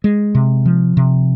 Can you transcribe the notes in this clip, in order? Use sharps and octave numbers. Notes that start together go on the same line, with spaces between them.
G#3
C3
F3
C3